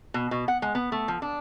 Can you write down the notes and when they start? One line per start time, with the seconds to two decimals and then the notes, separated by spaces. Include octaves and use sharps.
0.14 B2
0.31 B2
0.48 F#5
0.62 G#3
0.75 B3
0.92 A3
1.08 F3
1.22 D4